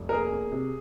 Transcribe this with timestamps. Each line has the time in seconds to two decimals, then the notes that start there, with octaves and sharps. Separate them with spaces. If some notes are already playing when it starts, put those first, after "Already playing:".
Already playing: F1
0.09 A#4
0.12 A#3 G#4
0.32 A#3
0.52 C3